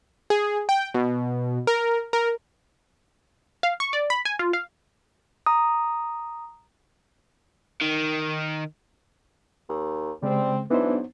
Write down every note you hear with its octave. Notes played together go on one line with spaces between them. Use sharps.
G#4
G5
B2
A#4
A#4
F5
C#6
D5
B5
G#5
F4
F5
A#5 D#6
D#3
D#2
C#3 G3 G#3 C4
G#2 E3 F#3 B3 D4 D#4 C5